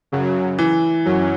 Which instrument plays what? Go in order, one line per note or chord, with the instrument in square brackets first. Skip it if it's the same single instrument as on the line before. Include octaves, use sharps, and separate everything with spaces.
[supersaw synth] F#2 C#3 F#3
[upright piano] E3
[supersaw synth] F#2 F#3 C#4